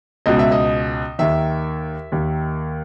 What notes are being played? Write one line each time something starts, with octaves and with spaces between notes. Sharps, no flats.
C#2 B2 D#5
E5
D#5
D#2 D#3 E5
D#2 D#3